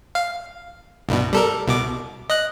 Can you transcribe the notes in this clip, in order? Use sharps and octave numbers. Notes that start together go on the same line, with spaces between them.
F5
C2 G2 B2
G3 A4 A#4
C2 B2 D6
D#5 F#6